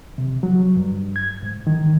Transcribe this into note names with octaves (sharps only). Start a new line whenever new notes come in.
C3
F#3
G2
G#6
G#2
D#3